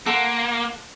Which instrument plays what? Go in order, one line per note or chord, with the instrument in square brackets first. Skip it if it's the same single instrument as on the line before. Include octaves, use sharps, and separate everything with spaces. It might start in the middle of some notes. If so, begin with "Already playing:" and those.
[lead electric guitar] A#3 [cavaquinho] A4 F#5 C6